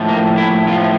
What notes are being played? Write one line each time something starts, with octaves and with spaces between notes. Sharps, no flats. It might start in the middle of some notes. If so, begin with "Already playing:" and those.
Already playing: A2 F3
A#3
E4
A2 F3 F4